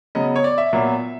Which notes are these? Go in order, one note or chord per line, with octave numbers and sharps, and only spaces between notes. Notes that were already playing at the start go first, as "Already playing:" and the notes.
C#3 F#3 B3 D#5
C#5
D5
E5
A#2 F#3 B3